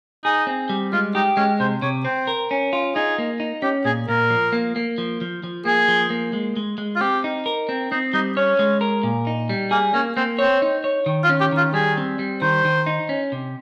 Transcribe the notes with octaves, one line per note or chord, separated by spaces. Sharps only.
D#4 G#4
C4
G3
G#3 F4
D#4 G4
G#3 C#4
C3 C5
C3 C#5
C4 C5
A#4
C#4
F4
D#4 G#4
A#3
D#4
C#4 G4
A#2 G#4
A#2 A#4
F3
A#3
A#3
F3
F3
F3
A#3 G#4
F3
A#3
G#3
G#3
G#3
F4
C4 G4
D#4
A#4
C4
C4 D#4
G3 D#4
C#4 C#5
G#3
A#4
A#2
D#4
G3
A#3 G#4
A#3 C#4
A#3 C4
C4 C#5
D#4
C#5
D#3
F4
C#4
G4
D#3 F4
G3 G#4
C4
G3
D#3 C5
D#3
D#4
C#4
C3